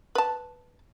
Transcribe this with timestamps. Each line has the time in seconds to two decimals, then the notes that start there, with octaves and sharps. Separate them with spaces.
0.15 B4 A5